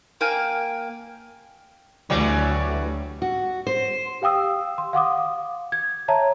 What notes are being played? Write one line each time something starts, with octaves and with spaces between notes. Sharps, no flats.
A#3 F5 G5 G#5
D2 E3 F#3 G3
F#4
C5
G4 F5 G5 D#6 E6
C6
F5 F#5 D6 D#6
G#6
C#5 E5 A5 A#5